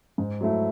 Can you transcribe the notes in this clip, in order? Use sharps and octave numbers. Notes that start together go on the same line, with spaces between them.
G#2
F#3 A3 E4